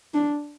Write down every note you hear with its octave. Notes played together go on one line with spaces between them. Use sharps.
D4